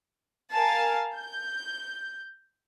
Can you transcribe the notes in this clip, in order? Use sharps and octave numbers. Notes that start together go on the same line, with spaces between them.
A#4 F5 G#5 A5
G6